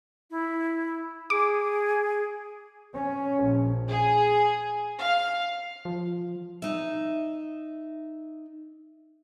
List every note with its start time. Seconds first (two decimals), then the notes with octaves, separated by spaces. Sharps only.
0.30 E4
1.30 G#4 D6
2.94 C#4
3.45 A#1
3.88 G#4
4.99 F5
5.85 F3
6.62 D#4 E5